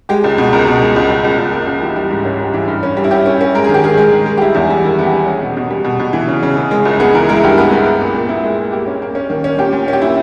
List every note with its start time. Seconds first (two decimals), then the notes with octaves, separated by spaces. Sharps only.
0.09 G#3 G4
0.24 C#2
0.38 B2
0.53 C#2 A#4
0.67 B2
0.82 G#3
0.96 C#2
1.10 C#2
1.24 C#2
1.38 C#2
1.53 A#3
1.67 C#2
1.82 E3 G4
1.96 G3
2.10 G#2
2.25 C#4
2.40 G3
2.54 E3
2.68 G2
2.83 C#4
2.97 G3
3.04 E4
3.11 C#4 G4
3.26 C#4
3.41 C#4
3.55 G#3 A#4
3.64 G#4
3.69 D#3
3.74 G4
3.84 D#3 G#4
3.98 G#3
4.12 D#3
4.26 G#3
4.37 G4
4.41 G3 E4
4.55 E2
4.70 G3
4.84 D#3 E4
4.99 B3
5.06 G4
5.13 G3
5.27 C#4 G#4
5.41 B2
5.57 B2
5.71 G3
5.84 B2
6.00 B2
6.13 E3
6.28 C#3
6.43 C#3
6.57 C#3
6.71 G#3
6.85 C#2
7.00 B3 G#4
7.14 E3 A#4
7.29 G#3 A#4
7.36 E4
7.44 G2 G4
7.58 B3
7.72 B3
7.86 B3
8.00 A#2
8.14 A#2
8.29 B3 E4
8.44 G#3
8.58 A#2
8.72 A#3 G4
8.87 C#4
9.02 A#3
9.15 C#4
9.30 D#3
9.44 C#4
9.58 A#2 G4
9.73 A#2
9.88 C#4
9.93 G4
10.02 A#2 E4